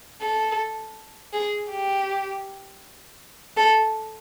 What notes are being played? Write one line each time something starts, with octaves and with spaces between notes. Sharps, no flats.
A4
G#4
G4
A4